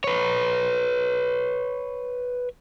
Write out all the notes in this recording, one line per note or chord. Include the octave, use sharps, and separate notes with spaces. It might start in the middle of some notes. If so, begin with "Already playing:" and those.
B4 C#5